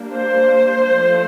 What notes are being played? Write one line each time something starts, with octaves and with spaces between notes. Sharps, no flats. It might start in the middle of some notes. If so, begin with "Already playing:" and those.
Already playing: G3 A#3 D4
C5
F3 A3